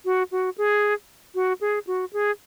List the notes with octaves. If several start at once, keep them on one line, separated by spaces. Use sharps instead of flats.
F#4
F#4
G#4
F#4
G#4
F#4
G#4